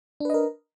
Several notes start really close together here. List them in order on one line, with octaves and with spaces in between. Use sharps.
D4 B4 D#5 A#4